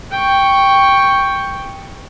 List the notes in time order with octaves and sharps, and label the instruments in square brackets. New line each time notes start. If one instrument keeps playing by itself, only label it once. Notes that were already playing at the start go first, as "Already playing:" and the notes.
[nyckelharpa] G5 C#6